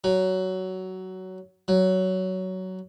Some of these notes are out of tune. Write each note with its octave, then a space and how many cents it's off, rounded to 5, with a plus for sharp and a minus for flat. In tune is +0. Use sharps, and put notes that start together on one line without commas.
F#3 +15
F#3 +15